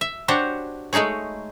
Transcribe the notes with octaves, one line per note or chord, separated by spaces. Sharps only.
E5
D4 F#4 G4 C5 C#5
G#3 A3 D#4 G#4 C#5